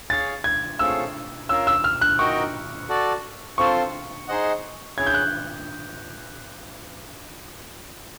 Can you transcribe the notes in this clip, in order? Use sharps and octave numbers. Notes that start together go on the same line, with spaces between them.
G#4 C#5 F5 A6
G#6
A3 C4 F4 G#4 C#5 E6
C#4 F4 A#4 E6
E6
F6
F#6
D#4 F#4 A#4 D#5 G5 C#6
F#4 A4 D5
C4 F4 A4 C5 C#6
D#4 G#4 C5 D#5 F#5
C#4 E4 G#4 G#6
G6
F#6